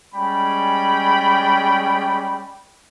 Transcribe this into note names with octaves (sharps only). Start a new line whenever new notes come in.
G3 G#3 C#4 D5 G5 B5